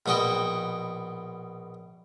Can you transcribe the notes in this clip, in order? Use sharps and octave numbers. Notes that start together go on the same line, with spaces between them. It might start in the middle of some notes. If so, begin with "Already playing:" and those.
A#1 B2 F#4 D#5 G5